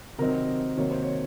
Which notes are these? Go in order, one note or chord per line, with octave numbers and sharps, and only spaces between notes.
C3 D#3 F#3 C4 D#4 A#4
C3 D#3 F#3 A#3 C#5
C5
C#5